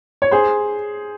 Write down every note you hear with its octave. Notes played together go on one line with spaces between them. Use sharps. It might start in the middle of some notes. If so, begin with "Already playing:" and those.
C#5
G#4 C5